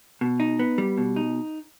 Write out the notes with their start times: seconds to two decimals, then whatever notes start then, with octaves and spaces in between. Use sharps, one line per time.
0.21 B2
0.40 D#4
0.59 B3
0.78 G3
0.98 B2
1.16 D#4